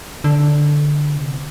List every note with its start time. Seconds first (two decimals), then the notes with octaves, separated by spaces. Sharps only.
0.24 D3
1.16 C3